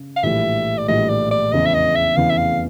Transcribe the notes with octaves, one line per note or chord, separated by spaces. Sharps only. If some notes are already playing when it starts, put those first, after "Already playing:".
Already playing: C#3
F5
A#1 A2 E3 G3 E5
D5
A#1 A2 E3 G3 D#5
D5
D5
F1 E2 C#3 E3 D#5
E5
D#5
E5
F1 E2 C#3 E3 F5
E5
F5